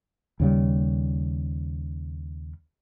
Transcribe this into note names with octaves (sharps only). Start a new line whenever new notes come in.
D#2 C#3 G3